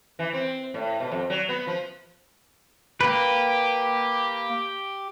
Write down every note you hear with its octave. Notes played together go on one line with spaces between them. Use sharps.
E3
C4
A2
B2
F2
F#3
B3
F3
A#3 G4 B4